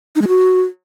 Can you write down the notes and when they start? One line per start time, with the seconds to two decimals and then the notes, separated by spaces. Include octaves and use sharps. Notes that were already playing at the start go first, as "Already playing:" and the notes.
0.16 D#4
0.22 G#3
0.28 F#4